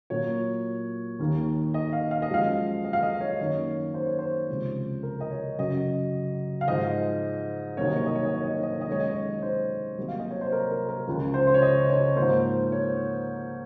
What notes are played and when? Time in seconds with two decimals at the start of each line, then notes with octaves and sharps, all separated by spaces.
0.10 A#2 F#3 A#3 C#5
1.19 D#2 D#3 A#3
1.74 D#5
1.93 F5
2.11 F5
2.22 D#5
2.29 F#2 F3 G#3 F5
2.84 D#5
2.93 F5
3.02 D#5
3.21 C#5
3.38 F#2 D#3 A#3 C#5
3.94 C5
4.06 C#5
4.19 C5
4.49 C#2 C3 F3 G#3
5.03 A#4
5.20 D#5
5.30 C#5
5.58 F#2 C#3 F#3 D#5
6.61 F5
6.68 G#2 F3 G#3 D#5
7.77 C2 C3 D#3 F#3 A#3 C#5
7.87 D#5
7.96 C#5
8.06 D#5
8.16 C#5
8.25 D#5
8.34 C#5
8.44 D#5
8.54 C#5
8.63 D#5
8.72 C#5
8.81 D#5
8.87 F#2 D#3 G#3 C#5
9.00 D#5
9.10 C#5
9.42 C5
9.98 C2 C3 F#3 A#3
10.08 F5
10.19 D#5
10.30 C#5
10.41 C5
10.52 A#4
10.71 A#4
10.89 A#4
11.07 C#2 C#3 F3
11.34 C5
11.47 C5
11.54 C#5
11.62 D#5
11.90 C#5
12.16 G#2 F3 A#3 C5
12.72 C#5